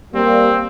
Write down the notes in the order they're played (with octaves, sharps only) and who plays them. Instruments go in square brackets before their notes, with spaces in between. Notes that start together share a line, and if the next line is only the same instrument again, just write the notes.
[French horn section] G3 A#3 [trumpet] C4